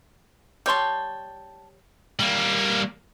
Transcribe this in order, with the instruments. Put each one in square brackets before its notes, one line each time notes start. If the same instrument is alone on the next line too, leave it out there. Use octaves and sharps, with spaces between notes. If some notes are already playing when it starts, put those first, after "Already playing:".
[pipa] G3 C#5 C6 [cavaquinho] G5 A5
[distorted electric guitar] G3 A#3